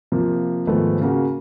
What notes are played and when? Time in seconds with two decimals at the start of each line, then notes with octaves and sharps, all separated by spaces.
0.12 C3 F3 A#3
0.67 G#2 D#3 F3 A3 B3
1.01 C#3 A#3 F#4